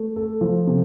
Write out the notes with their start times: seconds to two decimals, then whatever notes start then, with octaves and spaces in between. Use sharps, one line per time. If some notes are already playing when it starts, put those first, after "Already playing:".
Already playing: A3
0.16 A4
0.41 F3
0.67 C3